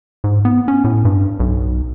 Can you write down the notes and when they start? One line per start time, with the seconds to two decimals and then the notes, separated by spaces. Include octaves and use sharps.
0.24 G#2
0.45 B3
0.68 C#4
0.84 A2
1.05 G2
1.40 B1